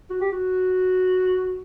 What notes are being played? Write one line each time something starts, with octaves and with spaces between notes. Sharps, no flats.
F#4
G4
F#4